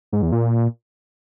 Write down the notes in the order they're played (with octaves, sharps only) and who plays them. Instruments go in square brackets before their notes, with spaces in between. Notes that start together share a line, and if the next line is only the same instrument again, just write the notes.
[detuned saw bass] G#2
E2
A#2